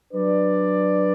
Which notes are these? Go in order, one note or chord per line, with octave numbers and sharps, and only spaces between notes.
F#3 D4 B4 D5